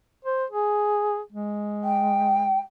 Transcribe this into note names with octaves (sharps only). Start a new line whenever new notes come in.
C5
G#4
G#3
G5